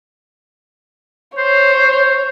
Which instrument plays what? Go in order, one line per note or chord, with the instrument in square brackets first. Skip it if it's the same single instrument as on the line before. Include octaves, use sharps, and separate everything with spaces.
[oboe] C5 [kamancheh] C#5